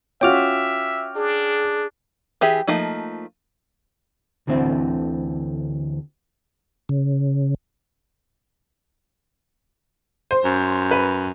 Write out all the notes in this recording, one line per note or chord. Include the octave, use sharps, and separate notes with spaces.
C#4 F4 F#4 E5 G5 D6 F6
D4 G#4
E3 G4 G#4 E5
F3 A3 A#3 D#4
D2 D3 E3 C4
C#3
C5
F#2
B4